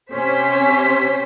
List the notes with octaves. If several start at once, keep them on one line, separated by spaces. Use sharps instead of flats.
C3 C#4 G4 C5 C#5 B6